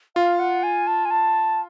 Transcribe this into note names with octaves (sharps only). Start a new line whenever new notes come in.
F4 F5
F#5
G#5
A5
G#5
A5